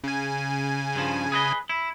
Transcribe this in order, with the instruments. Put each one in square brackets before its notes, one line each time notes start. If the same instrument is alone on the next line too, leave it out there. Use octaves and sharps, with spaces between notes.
[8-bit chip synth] C#3 G#5
[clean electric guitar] G2 F3
G#4 B4 D#5
E4